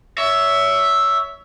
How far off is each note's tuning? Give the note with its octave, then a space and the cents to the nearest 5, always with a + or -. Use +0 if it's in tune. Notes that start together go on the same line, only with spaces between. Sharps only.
C#5 +25 E5 +0